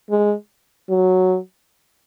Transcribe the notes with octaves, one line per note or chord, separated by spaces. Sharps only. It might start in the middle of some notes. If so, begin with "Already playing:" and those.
G#3
F#3